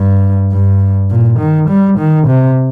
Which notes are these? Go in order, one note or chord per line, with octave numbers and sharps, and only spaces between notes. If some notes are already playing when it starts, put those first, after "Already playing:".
Already playing: G2
G2
A#2
D#3
G3
D#3
C3